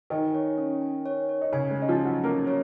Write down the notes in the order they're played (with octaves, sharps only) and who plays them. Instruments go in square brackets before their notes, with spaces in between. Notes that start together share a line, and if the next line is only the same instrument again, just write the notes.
[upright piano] D#3 D#4 [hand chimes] G#5
[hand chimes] C#5
C#4
G#5
C#5
C#5
[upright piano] D#4
[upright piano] C#3 C#4 [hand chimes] G#5
[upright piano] G#3
[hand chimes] C#4
[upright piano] D#4
F3 F4
[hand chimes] C#4
[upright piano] F#3 F#4
[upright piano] A#3 A#4 [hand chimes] C#4
[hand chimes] C#5